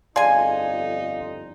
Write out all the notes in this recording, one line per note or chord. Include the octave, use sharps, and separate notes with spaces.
G1 F2 D#4 G#4 D5 F5 G#5 C6